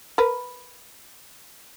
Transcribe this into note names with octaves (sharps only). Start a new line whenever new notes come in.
A#4 B4